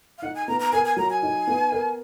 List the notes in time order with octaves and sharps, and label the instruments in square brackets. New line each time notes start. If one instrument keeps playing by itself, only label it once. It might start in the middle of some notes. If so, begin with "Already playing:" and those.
[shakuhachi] F5
[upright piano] D#4 [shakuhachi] F#5
[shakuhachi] G#5
[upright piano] B3 [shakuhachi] A#5
[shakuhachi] A#5
[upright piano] A#4 [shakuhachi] G#5
[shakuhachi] G#5
[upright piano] F#3 [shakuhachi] A#5
[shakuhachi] G#5
[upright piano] D#4
B3
A#4